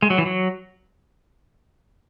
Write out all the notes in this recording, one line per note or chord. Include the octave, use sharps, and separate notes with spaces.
G#3
F#3
E3
F#3